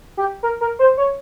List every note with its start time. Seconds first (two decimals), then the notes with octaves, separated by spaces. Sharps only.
0.17 G4
0.43 A#4
0.61 A#4
0.79 C5
0.97 C#5